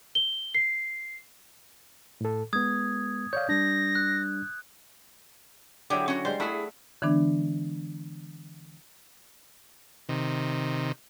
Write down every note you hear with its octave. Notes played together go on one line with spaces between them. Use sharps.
G7
C7
A2 A4
G#3 B3 D#6 G#6
C#5 D5 F5 G6
G3 D4 A#6
F#6
D3 F#3 E4 G4 G#4 G5
C#4 F#4
G3 G#3 C5
A3 E4 G#4 E5 F#5
D3 E3 G#3 B3 D4
C3 D#3